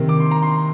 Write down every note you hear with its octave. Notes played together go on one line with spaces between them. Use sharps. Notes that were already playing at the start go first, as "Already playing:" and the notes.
Already playing: C3 D#3 A#3
D6
C6
A#5
C6